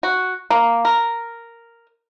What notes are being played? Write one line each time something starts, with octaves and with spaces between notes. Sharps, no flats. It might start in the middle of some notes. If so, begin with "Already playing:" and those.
F#4
A#3
A#4